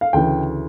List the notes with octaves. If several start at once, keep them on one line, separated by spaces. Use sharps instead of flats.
F5
D2 C#3 E3 G5